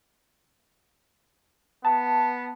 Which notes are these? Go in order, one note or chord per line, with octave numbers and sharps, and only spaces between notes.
B3 A5